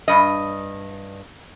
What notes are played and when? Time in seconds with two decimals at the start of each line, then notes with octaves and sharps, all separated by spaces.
0.08 G2 D#5